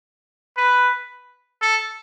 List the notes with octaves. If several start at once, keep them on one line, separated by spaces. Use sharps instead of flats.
B4
A4